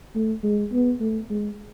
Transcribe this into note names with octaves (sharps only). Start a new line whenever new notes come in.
A3
G#3
B3
A3
G#3